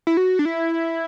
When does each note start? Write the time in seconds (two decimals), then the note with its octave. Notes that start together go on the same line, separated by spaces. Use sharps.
0.07 E4
0.17 F#4
0.39 D4
0.45 E4